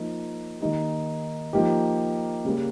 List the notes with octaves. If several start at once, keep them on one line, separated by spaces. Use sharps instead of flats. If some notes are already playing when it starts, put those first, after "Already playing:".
Already playing: F3 A#3 D#4
D#3 A#3 D#4 G4
F3 A#3 D#4 G4
C#3 G3 A#3